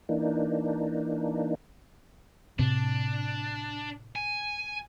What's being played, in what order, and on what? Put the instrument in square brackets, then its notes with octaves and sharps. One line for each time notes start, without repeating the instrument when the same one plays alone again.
[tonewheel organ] E3 A#3 D4 D#4
[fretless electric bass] A2 C3 C4 [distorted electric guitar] D4
[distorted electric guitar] G#5